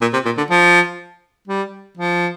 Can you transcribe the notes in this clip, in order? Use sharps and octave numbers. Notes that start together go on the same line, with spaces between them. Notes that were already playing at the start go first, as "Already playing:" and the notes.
A#2
C3
A#2
D3
F3
G3
F3